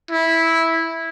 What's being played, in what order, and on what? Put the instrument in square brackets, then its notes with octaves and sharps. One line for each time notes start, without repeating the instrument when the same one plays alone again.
[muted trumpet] E4